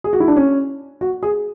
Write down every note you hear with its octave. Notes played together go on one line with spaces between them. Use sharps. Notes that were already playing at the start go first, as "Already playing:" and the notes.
G#4
F#4
E4
D4
C#4
F#4
G#4